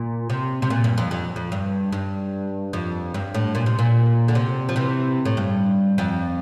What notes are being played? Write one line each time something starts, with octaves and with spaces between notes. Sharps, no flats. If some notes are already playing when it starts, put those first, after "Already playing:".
Already playing: A#2
C3
C3
A#2
G2
F2
F2
F2
G2
G2
F2
G2
A2
A#2
C3
A#2
D3
C3
F3
C3 E3
A2
G2
F2